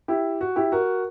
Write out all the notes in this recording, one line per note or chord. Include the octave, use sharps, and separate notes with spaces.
E4 G4
F#4
E4 G4
F#4 A#4